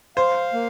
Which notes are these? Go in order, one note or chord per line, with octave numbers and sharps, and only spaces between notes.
C5 F5
A#3